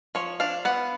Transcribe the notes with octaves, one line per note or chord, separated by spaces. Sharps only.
F3 C#5
D4 F5
B3 F#5